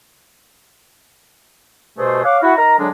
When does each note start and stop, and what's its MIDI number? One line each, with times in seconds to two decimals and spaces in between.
1.98 2.23 43
1.98 2.23 47
1.98 2.23 57
1.98 2.23 68
1.98 2.23 72
2.24 2.37 73
2.24 2.37 77
2.24 2.37 78
2.24 2.37 86
2.43 2.53 64
2.43 2.53 66
2.57 2.78 63
2.57 2.78 70
2.57 2.78 82
2.79 2.88 50
2.79 2.88 54
2.79 2.88 56
2.79 2.88 62